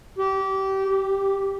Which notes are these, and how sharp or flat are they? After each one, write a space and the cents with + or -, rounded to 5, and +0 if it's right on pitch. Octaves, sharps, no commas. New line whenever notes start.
G4 -25
G4 +0